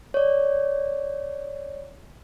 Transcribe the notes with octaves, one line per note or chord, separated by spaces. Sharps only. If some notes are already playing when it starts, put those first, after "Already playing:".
C#5 D5